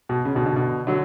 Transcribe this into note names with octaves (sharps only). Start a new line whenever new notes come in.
B2
C#3
B2 D3
B2 D3
B2 D3
D3 F#3